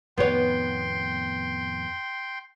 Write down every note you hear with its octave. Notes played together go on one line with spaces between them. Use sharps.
F2 A2 D#3 B3 C#5 G5 C6